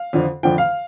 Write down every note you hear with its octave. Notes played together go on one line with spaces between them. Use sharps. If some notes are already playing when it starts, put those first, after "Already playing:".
Already playing: F5
F2 D3 F3
F2 D3 F3 G5
F5